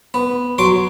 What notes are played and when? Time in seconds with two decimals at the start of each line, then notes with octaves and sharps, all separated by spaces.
0.14 B3
0.58 F#3 C6 D6